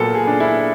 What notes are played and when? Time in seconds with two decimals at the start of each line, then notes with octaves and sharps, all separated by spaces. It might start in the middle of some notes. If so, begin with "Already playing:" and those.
Already playing: A#2 F#3 B3 A4 A#4
0.15 G#4
0.27 D4
0.40 E4